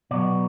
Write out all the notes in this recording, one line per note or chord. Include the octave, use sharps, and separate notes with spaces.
B2 F#3 B3 D5